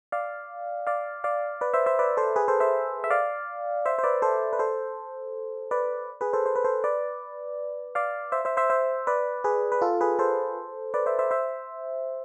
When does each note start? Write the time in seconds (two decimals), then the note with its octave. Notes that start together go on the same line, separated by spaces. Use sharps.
0.12 D5 F5
0.87 D5 F5
1.24 D5 F5
1.61 B4 D5
1.74 C5 E5
1.86 C5 E5
1.99 B4 D5
2.17 A4 C5
2.36 G#4 B4
2.48 A4 C5
2.60 C5 E5
3.04 E5
3.11 D5 F5
3.86 C5 E5
3.99 C5
4.04 B4 D5
4.22 A4 C5
4.53 B4
4.59 A4 C5
5.71 B4 D5
6.21 G#4 B4
6.33 A4 C5
6.46 C5
6.56 B4
6.64 A4 C5
6.84 B4 D5
7.95 D5 F5
8.32 C5 E5
8.45 C5 E5
8.57 C5 E5
8.70 C5 E5
9.07 B4 D5
9.44 G#4 B4
9.72 B4
9.82 F4 A4
10.01 G#4 B4
10.19 A4 C5
10.94 B4 D5
11.06 C5 E5
11.19 C5 E5
11.31 C5 E5